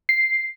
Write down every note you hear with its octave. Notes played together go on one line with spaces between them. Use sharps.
C7